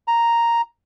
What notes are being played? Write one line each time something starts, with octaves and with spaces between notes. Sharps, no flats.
A#5